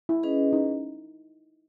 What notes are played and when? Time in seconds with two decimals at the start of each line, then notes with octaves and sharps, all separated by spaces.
0.09 E4
0.23 C#4 G#4 B4 D#5
0.53 D#4